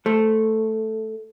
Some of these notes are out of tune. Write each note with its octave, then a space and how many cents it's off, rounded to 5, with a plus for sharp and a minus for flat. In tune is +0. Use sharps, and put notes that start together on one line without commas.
A3 +0 A4 +0 C5 +0